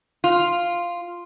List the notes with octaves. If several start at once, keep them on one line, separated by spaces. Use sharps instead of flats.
F4